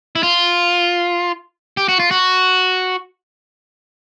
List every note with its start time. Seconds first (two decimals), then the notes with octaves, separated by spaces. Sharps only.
0.16 E4
0.23 F4
1.77 G4
1.89 F#4
2.00 F4
2.11 F#4